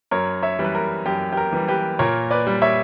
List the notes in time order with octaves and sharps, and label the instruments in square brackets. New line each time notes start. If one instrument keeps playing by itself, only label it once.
[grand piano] F#2 A#4 C#5
C#5 E5
E3 G3
B4
A#4
F#2 G4
G4
A#4
E3 G3
G4 B4
A#2 A#4 C#5
B4 D5
G3
C#5 E5